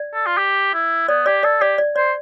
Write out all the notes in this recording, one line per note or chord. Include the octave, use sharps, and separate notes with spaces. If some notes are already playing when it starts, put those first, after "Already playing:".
Already playing: D5
A4
F4
G4
E4
B3 D5
G4 D5
A4 D5
G4 D5
D5
C5 D5